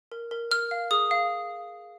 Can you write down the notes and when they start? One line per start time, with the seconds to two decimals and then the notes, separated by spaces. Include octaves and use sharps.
0.12 A#4
0.31 A#4
0.51 A#4 F6
0.71 F5
0.91 G#4 D#6
1.11 F5